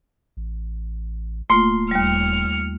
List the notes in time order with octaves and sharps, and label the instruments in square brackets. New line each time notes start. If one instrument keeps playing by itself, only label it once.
[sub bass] A1
[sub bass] D1 [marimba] A3 A#3 F4 [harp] C6
[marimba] D#2 G3 [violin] F6 C#7